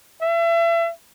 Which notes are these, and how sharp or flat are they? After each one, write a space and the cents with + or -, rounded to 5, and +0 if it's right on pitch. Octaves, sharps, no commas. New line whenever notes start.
E5 +35